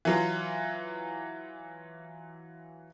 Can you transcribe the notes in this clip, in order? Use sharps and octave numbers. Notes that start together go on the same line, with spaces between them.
E3 F#3 F4